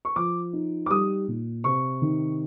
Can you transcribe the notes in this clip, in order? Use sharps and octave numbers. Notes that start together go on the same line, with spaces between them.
C#6
F3 D6
D#4
D6
G3 D#6
A#2
C3 C#6
D#3